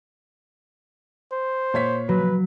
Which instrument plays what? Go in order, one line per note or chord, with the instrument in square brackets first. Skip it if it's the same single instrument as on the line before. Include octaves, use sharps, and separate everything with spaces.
[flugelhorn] C5
[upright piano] A#2 C#5 B6
[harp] F#3 [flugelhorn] B4